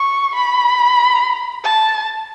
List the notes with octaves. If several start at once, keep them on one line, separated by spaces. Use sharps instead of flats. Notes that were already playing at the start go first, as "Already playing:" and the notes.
Already playing: C#6
B5
A5